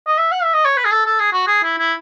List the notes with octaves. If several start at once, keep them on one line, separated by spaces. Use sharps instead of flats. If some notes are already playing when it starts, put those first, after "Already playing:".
D#5
E5
F#5
E5
D#5
C#5
B4
G#4
A4
A4
G#4
F#4
G#4
E4
E4